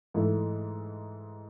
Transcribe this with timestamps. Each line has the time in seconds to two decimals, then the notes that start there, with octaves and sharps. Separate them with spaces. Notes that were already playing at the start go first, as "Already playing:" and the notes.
0.14 G#2 E3 A3